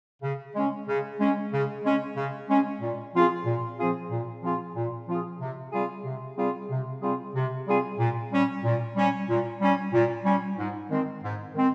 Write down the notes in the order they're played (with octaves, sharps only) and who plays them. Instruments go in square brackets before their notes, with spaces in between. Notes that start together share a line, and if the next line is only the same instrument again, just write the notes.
[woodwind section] C#3
G#3 C#4
C#3
G#3 C#4
C#3
G#3 C#4
C#3
G#3 C#4
A#2
F3 C4 F4 G#4
A#2
F3 C4 F4 G#4
A#2
F3 C4 F4 G#4
A#2
F3 C4 F4 G#4
C3
G3 C4 F4 G#4
C3
G3 C4 F4 G#4
C3
G3 C4 F4 G#4
C3
G3 C4 F4 G#4
A#2
G3 C#4
A#2
G3 C#4
A#2
G3 C#4
A#2
G3 C#4
G#2
D#3 G#3 C4
G#2
D#3 G#3 C4